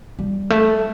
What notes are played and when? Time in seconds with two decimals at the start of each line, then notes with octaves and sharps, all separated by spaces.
0.19 G3
0.50 A3